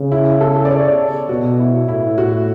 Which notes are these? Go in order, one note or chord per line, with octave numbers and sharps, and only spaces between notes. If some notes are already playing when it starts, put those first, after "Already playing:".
Already playing: C#3
E4
A4
D5
C#5
B2 F#4
E4
A2 E4
F#4